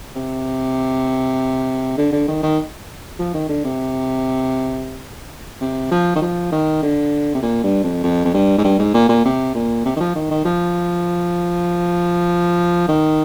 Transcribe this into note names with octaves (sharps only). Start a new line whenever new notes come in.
C3
D3
D3
D#3
D#3
F3
D#3
D3
C3
C3
F3
D#3
F3
D#3
D3
C3
A#2
G2
F2
F2
F2
G2
G#2
G2
G#2
A#2
A#2
C3
A#2
C3
D#3
F3
D#3
D#3
F3
D#3